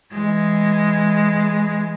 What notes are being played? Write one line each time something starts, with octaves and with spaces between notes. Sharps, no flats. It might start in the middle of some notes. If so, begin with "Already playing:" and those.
E3 G#3